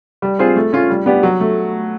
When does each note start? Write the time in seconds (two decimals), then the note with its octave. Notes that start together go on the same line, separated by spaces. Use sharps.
0.22 G3
0.39 C4 F4 G#4 C5
0.56 A3
0.73 C#4 F4
0.90 G3
1.06 B3 D4 G4
1.23 F#3
1.40 A3